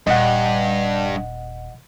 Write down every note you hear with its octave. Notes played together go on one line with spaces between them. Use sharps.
D#1 G2 D#5 F#5